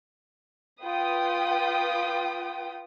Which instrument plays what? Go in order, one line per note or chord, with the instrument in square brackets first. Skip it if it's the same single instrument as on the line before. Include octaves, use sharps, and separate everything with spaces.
[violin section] F4 B4 G5 D#6